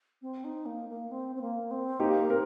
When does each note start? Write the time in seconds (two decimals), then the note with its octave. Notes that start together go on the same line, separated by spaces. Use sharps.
0.22 C4
0.44 D#4
0.66 A#3
0.89 A#3
1.11 C4
1.36 C4
1.41 A#3
1.71 C4
2.00 A#3 D#4 G4
2.29 C4 A#4